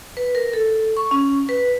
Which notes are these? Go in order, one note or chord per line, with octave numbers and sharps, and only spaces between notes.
B4
A#4
A4
C#6
C#4
B4